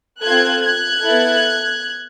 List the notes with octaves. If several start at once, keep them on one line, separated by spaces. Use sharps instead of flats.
C4 F4 A4 F#6 G#6
F#6 G#6
B3 E4 A4